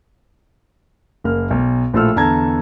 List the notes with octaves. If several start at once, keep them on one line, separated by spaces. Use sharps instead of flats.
F#1 A#3 F6
B1
A#1 A2 F4 A4 E6 F6
E2 D3 A5 A#5 G#6